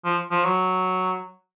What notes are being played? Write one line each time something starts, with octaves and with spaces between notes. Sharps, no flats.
F3
F3
F#3